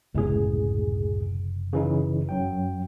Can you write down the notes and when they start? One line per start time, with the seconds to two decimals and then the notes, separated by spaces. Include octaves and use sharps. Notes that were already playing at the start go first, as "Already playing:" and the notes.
0.15 F#1 C#2 A2 C3 B3 G#4
1.73 C#3 E3 D#4
2.29 F#2 F#3 G5